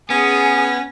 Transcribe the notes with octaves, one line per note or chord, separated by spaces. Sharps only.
B3 C#4 G#4